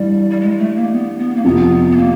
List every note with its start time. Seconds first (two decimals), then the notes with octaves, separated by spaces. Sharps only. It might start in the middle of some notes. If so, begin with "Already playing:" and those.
Already playing: G2 E3 G3
0.30 G3
0.40 G#3
0.58 A3
0.76 A#3
0.92 B3
1.19 B3
1.36 A#3
1.44 F2 C3 F3 B3
1.91 B3
1.97 A#3